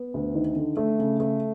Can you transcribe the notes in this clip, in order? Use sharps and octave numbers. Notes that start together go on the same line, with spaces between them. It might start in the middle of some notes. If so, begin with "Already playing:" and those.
Already playing: B3
D2
D#3
D3
A3
C#3
A3